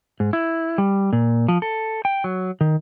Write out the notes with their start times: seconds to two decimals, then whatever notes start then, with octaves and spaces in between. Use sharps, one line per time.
0.20 G#2
0.33 E4
0.78 G3
1.13 A#2
1.48 F3
1.62 A4
2.05 G5
2.24 F#3
2.61 D#3